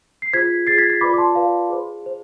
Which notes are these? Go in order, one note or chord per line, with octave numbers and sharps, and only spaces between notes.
C7
F4 G#4 C5 G#6 B6
F4 G#4 C5 A6 C7
G#6 B6
G#6 B6
F4 B4 D5 B5 D6
D6
A5 C6
F4 B4 D5 F5
G#4 C5
G#4 C5